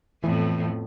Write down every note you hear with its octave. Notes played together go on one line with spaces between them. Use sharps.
F2 A2 E3 B3